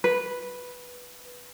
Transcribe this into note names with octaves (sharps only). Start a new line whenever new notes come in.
B4